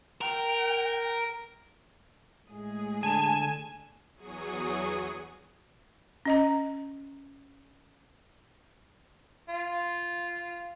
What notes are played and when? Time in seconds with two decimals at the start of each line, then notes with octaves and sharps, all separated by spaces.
0.21 A#4 G5
2.46 A2 G#3 G#4
3.03 D3 G#5 A5
4.16 E2 F#3 G#4 C#6 D#6
6.25 C#4 D#5 A#5
9.49 F4